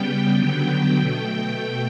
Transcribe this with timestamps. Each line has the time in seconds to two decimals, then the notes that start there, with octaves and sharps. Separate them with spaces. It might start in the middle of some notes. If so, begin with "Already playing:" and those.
Already playing: C#3 G3 B3 G5
0.35 D3 F#3 B3
0.99 B2 A3 G5
1.31 G5